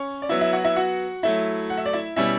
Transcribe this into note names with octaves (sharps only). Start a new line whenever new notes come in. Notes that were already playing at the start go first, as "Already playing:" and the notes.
Already playing: C#4 C#5
D5
F#3 B3 E4 E5
E4 E5
F#4 F#5
E4 E5
F#4 F#5
F#3 A3 E4 E5
F#5
E5
D5
E4 E5
B2 G3 C#4 E4 E5